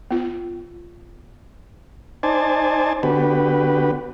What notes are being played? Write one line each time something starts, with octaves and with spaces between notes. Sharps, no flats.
B3 F4
D#4 C5 D5 G#5 A5
D3 B3 F#4 G4 B4